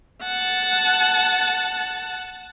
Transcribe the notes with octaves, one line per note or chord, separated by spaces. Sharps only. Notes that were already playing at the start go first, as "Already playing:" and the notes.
F#5 A5